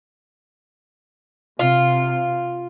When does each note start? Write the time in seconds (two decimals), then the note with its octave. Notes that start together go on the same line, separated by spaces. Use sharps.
1.59 C3 F4